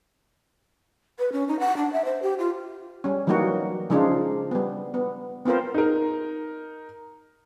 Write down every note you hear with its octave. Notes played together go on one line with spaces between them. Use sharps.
B4
C#4
D#4
F#5
D4
E5
C5
G4
F4
G3 C#4
E3 F#3 G3 A#3 D#4 F#4
C#3 F3 G#3 D4 D#4 F4
G3 B3
B3
B3 C4 F4 A#4 C5
D#4 A#4